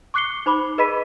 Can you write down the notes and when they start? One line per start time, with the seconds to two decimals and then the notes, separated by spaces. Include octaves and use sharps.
0.14 C#6 D6 F#6 C7 C#7 G7
0.46 D#4 C5 B5 D6
0.78 G#4 B4 D#5 B5 B6 D#7